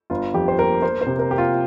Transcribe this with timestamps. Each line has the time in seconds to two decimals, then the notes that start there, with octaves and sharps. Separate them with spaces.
0.10 G1 F4
0.34 F2 G4
0.48 C5
0.59 A#3 A#4
0.82 A#3 C5
1.01 C5
1.07 C3
1.19 A#4
1.31 A#3 G4
1.38 F4